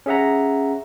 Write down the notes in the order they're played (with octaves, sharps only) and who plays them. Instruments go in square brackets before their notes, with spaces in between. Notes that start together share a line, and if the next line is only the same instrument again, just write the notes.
[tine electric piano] C#4 G#4 E5 F#5 A#5